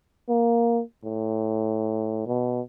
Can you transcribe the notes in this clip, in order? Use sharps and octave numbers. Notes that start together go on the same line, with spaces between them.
A#3
A2
B2